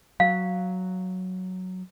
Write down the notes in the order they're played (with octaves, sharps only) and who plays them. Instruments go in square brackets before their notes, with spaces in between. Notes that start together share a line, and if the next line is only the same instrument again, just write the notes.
[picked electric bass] F#3 [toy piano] F5